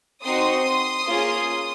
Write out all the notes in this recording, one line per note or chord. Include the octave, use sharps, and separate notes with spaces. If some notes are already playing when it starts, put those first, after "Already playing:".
C4 D#4 F#4 C6 D#6
A#3 C#4 F4 G#4